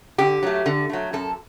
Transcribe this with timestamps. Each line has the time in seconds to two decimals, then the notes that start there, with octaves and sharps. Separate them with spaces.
0.18 D3 G4
0.43 F#3 A3
0.66 D3
0.89 F#3 A3
1.13 F#2 A4